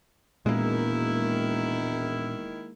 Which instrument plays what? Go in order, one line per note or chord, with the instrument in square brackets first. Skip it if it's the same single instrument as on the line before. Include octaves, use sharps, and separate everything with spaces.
[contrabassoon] E1 [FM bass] A#2 [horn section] D#3 E4 [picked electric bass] G#3 A#3